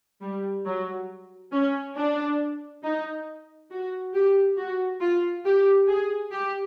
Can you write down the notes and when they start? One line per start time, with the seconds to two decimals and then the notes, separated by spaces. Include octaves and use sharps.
0.21 G3
0.66 F#3
1.52 C#4
1.96 D4
2.83 D#4
3.71 F#4
4.14 G4
4.57 F#4
5.01 F4
5.45 G4
5.88 G#4
6.32 G4